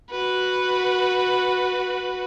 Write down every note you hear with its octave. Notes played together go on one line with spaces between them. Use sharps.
F#4 B4